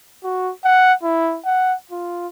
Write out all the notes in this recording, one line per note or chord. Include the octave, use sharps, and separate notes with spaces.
F#4
F#5
E4
F#5
F4